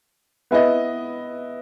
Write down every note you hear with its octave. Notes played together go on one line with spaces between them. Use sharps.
B3 E4 B4 D#5